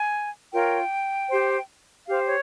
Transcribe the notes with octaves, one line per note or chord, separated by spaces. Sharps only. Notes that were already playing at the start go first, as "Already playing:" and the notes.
Already playing: G#5
F4 A#4 C#5 G5
G4 C5
G4 C5 F5
C#5